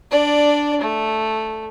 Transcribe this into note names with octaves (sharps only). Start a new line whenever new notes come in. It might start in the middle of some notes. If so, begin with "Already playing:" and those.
D4 D5
A3